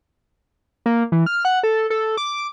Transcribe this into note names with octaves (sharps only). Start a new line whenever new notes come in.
A#3
E3
F6
F#5
A4
A4
D6